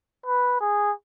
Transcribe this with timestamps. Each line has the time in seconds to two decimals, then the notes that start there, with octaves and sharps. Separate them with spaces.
0.26 B4
0.61 G#4